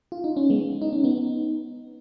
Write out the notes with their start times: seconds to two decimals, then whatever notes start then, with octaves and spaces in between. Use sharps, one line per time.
0.12 F4
0.24 D#4
0.36 C#4
0.50 G#3 B3
0.81 D#4
0.93 C#4
1.04 B3 D#4